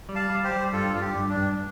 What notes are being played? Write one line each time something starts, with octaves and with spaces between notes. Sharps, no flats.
G3
F5 A5
G3
G4 C5
G3
G2 F4 A4
G2 F4
G4
G2
D4
G2